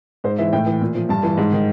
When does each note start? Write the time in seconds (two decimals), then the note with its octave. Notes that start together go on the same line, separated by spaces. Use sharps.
0.24 G#2 C5
0.38 E3 E5
0.53 A2 G5
0.66 E3
0.81 A#2
0.95 F3
1.09 G2 A5
1.23 E3
1.37 G#2
1.52 D#3